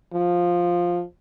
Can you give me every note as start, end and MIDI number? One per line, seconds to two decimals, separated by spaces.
0.14 1.03 53